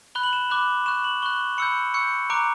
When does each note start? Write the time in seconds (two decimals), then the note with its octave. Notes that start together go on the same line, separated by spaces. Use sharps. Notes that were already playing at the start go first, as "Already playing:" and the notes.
0.15 B5 F#6 G7
0.23 F#7
0.33 E7
0.50 B5 D6 F#6
0.86 C#6 F#6 E7
1.04 F#7
1.22 C#6 F#6 G7
1.58 B5 E6 G6 C#7
1.94 C#6 E6 G6 C#7
2.30 A#5 D6 F#6 D7